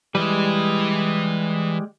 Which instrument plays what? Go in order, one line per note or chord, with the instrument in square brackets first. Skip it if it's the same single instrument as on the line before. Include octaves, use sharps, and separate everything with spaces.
[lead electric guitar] E3 B4 [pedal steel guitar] G3 G#3